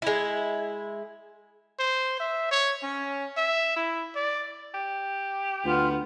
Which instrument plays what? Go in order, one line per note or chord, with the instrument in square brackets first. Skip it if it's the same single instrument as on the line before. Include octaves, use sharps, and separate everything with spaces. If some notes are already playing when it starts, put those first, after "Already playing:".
[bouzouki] G#3 E4
[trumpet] C5
E5
C#5
C#4
E5
E4
D5
[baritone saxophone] G4
[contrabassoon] D2 [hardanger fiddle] B3 [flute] F4